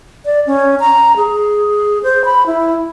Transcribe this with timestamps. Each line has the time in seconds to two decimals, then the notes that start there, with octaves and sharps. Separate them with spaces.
0.25 D5
0.47 C#4
0.80 A#5
1.17 G#4
2.03 C5
2.25 B5
2.46 E4